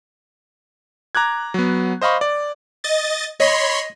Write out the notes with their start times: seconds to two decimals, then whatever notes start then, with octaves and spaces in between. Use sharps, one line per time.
1.15 A#5 D6 F#6 G#6
1.54 F#3 B3
2.01 C5 D#5 F5 B5 C#6
2.21 D5
2.84 D#5 A6
3.40 C#5 D#5 B5 C6